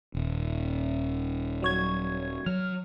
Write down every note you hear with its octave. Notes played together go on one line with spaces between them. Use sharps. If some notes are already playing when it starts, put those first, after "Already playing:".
D#1
F#3 C#5 G#6
F#3 F6